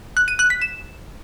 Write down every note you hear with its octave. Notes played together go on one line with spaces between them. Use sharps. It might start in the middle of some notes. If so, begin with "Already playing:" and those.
F#6
D#7
F#6
B6
E7